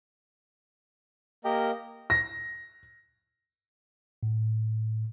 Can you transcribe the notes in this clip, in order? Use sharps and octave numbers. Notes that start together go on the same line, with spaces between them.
A#3 G4 A#4 D#5
A#6
A2